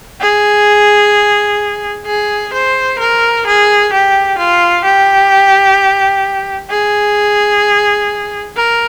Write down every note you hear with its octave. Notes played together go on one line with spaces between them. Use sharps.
G#4
G#4
C5
A#4
G#4
G4
F4
G4
G#4
A#4